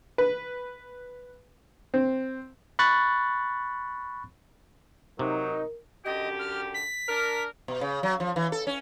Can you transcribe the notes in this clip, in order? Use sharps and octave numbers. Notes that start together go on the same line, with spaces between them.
B4
C4
B5 C#6 F#6 A6
C3 F#3 D#4 A#4
F#2 D3 G4 D#5
F6
B6
D4 A#4
B2
C#3
F#3
F3
E3
A4
C#4